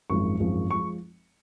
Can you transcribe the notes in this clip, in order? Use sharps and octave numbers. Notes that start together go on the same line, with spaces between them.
G#1 F#2 F3 G#3 C#6
G#1 F#2 F3 G#3
F3 G#3 C#6